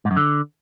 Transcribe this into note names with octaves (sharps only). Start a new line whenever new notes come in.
G#2
F#2
D3